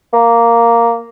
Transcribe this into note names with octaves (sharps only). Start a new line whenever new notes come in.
A#3